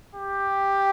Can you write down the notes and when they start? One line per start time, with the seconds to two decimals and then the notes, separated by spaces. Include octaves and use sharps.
0.15 G4